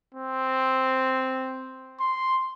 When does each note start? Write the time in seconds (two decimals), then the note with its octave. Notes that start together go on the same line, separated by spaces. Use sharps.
0.14 C4
2.00 C6